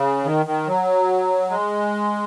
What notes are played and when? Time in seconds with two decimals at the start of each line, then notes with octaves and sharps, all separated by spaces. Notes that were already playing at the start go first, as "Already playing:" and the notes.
Already playing: C#3
0.25 D#3
0.46 D#3
0.67 F#3
1.50 G#3